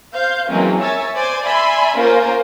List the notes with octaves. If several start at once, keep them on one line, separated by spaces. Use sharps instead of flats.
C5 F5 G6
E3 F#3 G#3 A#3 C4 C#4
A#4 C#5 E5 G#5 E6 A6
C5 D5 G#5
D5 E5 G#5 B5 C6
A#3 C#4 F4 A#4 C5